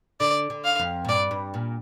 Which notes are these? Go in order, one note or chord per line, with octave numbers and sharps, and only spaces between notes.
D3 D5
D3
F5
F2
A#2
G2 D5
G2
A#2